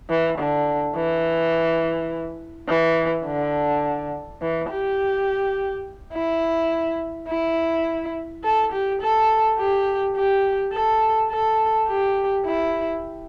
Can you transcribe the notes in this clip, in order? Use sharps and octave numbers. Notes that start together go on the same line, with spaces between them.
E3
D3
E3
E3
D3
E3
G4
E4
E4
A4
G4
A4
G4
G4
A4
A4
G4
E4